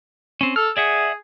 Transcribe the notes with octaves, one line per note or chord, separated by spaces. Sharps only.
C4 C#4
A4 F6
G#4 D5 E5 F#5